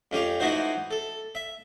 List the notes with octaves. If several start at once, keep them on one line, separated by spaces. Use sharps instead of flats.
F2 C#4 G4 F5
E3 A3 D#4 E4 F#4 C5
A4
E5